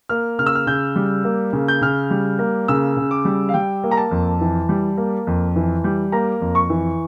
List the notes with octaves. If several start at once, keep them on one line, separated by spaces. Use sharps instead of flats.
A#3 F6
C#3 F6
E6
F6
C#3 G6
G3
A#3
C#3
G6
C#3 F6
G3
A#3
C#3 E6
C#3
D6
G3
F5
G3 G5
A#3
A#5
A5
F2
E3
G3
A#3
F2
E3
G3
A#3 A#5
F2
C#6
E3